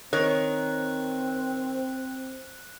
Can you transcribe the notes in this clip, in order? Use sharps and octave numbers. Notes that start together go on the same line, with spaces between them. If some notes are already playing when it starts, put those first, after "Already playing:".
D#3 C4 A#4 C#5 F#6